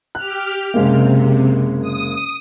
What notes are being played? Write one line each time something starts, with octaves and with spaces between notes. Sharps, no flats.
G4 F6 F#6
F#1 C3 G#3 A#3
D#6